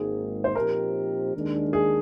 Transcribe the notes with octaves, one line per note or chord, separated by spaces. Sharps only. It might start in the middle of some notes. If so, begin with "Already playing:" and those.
Already playing: G#1 G#2 D#3 A#3 G#4
C5
A#2 F3 C4 D#4 G4 A#4
D#2 D#3 G#3 D4
G#4